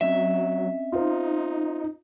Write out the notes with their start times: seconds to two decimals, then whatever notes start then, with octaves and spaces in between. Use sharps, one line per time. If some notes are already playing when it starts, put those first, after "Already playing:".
0.01 F#3 C4 C#4 D#5 E5
0.92 D#4 F4 C5